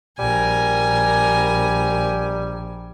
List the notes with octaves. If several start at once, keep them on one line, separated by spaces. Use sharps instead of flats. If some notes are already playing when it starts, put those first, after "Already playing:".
A#1 G3 A#4 G#5